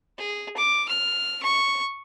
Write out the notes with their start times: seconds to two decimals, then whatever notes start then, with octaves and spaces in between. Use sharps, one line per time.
0.18 G#4
0.57 D6
0.88 F6
1.43 C#6